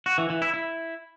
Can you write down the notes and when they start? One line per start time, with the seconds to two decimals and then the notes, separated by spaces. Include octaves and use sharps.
0.06 F#4
0.18 E3
0.30 E3
0.42 E4
0.54 E4